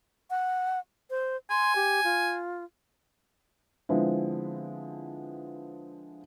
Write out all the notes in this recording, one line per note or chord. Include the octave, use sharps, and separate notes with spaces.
F#5
C5
G#5 C6
G4
F4
D3 F3 G#3 B3 C4 E4